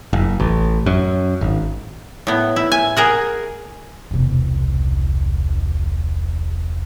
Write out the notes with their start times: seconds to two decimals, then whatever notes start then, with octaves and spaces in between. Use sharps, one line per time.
0.13 F#1
0.40 A1
0.86 F#2
1.41 G#1
2.27 A2 B3
2.56 E4
2.72 G#5
2.97 G#4 A#4 F#5
4.11 E1 C2